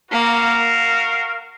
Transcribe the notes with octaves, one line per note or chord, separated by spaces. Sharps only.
A#3 F#4 A#4 F5